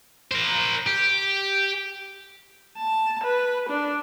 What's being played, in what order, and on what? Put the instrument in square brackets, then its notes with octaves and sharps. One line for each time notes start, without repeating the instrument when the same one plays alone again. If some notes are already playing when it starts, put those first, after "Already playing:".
[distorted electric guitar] A#4 C5
G4
[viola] A5
B4
D4